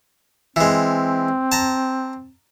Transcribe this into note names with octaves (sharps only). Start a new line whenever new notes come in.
E3 G#3 C4
A5 A#5